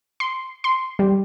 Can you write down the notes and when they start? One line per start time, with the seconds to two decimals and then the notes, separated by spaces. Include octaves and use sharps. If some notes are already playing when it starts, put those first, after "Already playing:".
0.20 C6
0.64 C6
0.99 G3